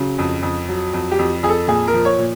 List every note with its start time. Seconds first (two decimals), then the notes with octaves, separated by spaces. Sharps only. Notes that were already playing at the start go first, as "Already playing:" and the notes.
Already playing: C#3 F#3
0.18 F2
0.42 F2
0.69 F#3
0.94 F2
1.11 G4
1.19 F2
1.43 F2 G#4
1.49 A4
1.68 A#2 G#4
1.88 A#4
1.94 F3
2.05 C#5
2.19 A#2